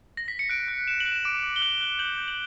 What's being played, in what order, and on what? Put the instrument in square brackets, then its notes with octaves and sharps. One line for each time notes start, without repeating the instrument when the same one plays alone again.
[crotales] A#6
B6
C#7
F#6 D7
F#6
F#6 E7
F#7
F#6
E7
D6 D7
D6
G7
F#6 F#7
F#6
G6 F#7
G6
F#7